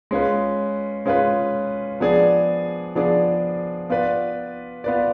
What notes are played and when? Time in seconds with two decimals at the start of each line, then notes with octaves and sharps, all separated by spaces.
0.11 G#3 C#4 F4 B4
1.06 G#3 C#4 F4 B4
2.00 F3 B3 D4 G#4 D5
2.95 F3 B3 D4 G#4 D5
3.90 B3 F4 B4 D5
4.84 B3 F4 B4 D5